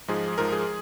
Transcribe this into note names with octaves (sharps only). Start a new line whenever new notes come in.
G#2 F3 G#3 G#4
G#2 F3 G#3 A#4
G#4